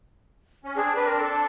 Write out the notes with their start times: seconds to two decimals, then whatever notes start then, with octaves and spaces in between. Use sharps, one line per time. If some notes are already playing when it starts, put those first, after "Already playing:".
0.64 C#4
0.76 C4 D4 G#4
0.95 B4
1.07 A#4
1.20 A4